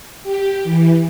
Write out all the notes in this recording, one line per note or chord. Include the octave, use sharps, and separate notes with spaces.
G4
E3